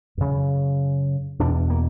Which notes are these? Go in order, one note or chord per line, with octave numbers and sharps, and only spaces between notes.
F#2 C#3
E2 B2 D4
A#3